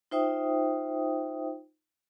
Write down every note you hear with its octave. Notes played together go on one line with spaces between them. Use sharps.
D#4 F4 C5 E5 G5 D#6